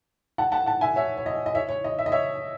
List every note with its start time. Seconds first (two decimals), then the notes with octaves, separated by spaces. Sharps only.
0.38 F#5 A5
0.52 F#5 A5
0.66 F#5 A5
0.81 E5 G#5
0.96 C#5 E5
1.17 C#5
1.26 D#5
1.46 D#5
1.55 C#5 E5
1.69 C#5
1.84 D#5
1.99 E5
2.06 D#5
2.12 C#5 E5